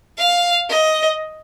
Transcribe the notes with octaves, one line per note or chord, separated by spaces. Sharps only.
F5
D#5